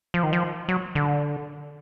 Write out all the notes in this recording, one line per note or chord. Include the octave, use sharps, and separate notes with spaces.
F3
D#3
F3
F#3
D3